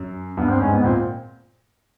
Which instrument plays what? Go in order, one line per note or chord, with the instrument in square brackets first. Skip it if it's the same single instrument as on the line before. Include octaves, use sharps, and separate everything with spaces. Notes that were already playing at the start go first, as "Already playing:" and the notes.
Already playing: [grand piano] F#2
[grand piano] G2 [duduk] B3
[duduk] C4
[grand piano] G#2 [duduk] C#4
[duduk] B3
[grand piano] A#2 [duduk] C4